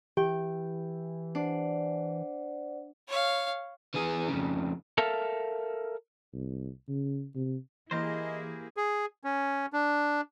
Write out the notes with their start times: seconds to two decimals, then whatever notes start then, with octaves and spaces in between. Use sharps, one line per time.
0.17 E3 G4 G5
1.35 D4 C5 D5 F#5
3.08 C#5 F5
3.94 E3 G#4
4.29 F2 C#3
4.98 A4 A#4 E5 F5 A5
6.33 C2
6.88 C#3
7.35 C3
7.91 E3 A#3 E4 G4 G#4 A#4 C5 D#5
8.77 G#4
9.24 C#4
9.73 D4